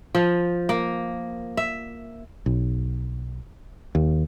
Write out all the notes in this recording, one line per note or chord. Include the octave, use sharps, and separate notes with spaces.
F3
A#3
E5
B1
D#2